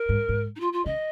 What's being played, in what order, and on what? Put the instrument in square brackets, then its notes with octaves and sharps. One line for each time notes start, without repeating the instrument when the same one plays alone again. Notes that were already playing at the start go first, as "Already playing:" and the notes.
Already playing: [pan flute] A#4
[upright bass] G#2
G#2
[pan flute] D#4
F4
F4
[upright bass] C#3 [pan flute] D#5